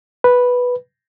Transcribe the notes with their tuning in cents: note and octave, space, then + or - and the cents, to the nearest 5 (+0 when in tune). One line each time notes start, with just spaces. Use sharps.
B4 -5